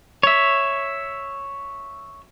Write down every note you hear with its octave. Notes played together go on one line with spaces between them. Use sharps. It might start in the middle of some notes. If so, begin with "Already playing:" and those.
C#5 E5